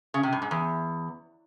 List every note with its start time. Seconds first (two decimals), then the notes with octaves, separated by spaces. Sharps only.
0.14 C#3
0.23 C3
0.33 G2
0.42 G#2
0.51 E2